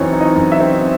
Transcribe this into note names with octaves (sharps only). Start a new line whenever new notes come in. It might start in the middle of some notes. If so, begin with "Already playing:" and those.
Already playing: F#2 E3 C4 D#4 C#5
D#4
D#5
F#2
E5
C4